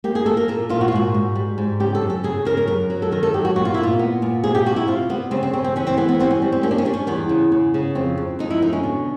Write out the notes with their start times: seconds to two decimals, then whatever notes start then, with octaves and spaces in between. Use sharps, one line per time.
0.04 A#3 G4
0.15 G#4
0.26 A#3 A4
0.37 A#4
0.48 A#2 A4
0.69 A#2 F4
0.81 F#4
0.88 F4
0.92 G#2 F#4
1.14 G#2
1.35 G3
1.58 G#2
1.80 C#3 G4
1.95 A4
2.01 F#2
2.10 A4
2.23 C#3 G#4
2.45 C#3 A#4
2.57 A#4
2.68 F#2 A#4
2.90 F#3
3.02 A4
3.12 D#3 A#4
3.23 A4
3.34 F#3 G4
3.45 F#4
3.56 A#2 F#4
3.65 F4
3.74 A#2 E4
3.83 F4
3.99 B3
4.22 A#2
4.43 C3 G#4
4.55 G4
4.66 C3 F#4
4.76 E4
4.87 C3 F4
5.09 G3 B3
5.31 C#3 C4
5.43 C4
5.53 C#3 C4
5.64 C4
5.76 E3 C#4
5.87 C4
5.97 E3 B3
6.09 B3
6.20 G3 C4
6.31 C#4
6.42 G3
6.52 C4
6.63 A#3 C#4
6.71 D4
6.78 C#4
6.85 G3 D4
6.93 C#4
7.07 E2 B3
7.29 C#3
7.52 C#3
7.74 C#3
7.95 F2 C4
8.17 F2
8.39 F2 D#4
8.50 E4
8.62 D3 D#4
8.73 C#4
8.83 B2